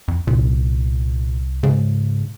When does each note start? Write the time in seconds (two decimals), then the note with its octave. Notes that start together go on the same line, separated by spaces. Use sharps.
0.08 F2
0.27 C2 A#2
1.63 G#2 C#3